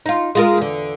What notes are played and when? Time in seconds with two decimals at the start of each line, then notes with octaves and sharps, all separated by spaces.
0.06 D#4 F4
0.35 G#3 F4 A#4
0.57 E2 D3